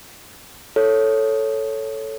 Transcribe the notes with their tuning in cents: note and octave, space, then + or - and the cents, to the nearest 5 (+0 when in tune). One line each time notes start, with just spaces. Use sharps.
A4 +0 C#5 +0